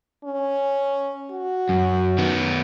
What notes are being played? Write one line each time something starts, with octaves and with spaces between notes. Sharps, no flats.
C#4
F#4
F#2
D#3 B3